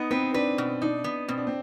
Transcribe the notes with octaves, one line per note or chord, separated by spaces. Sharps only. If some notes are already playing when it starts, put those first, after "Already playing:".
Already playing: B3 D#4
C4 B4
D4 B4
B2
D4 D#4
B3
B2 C4
D4
C4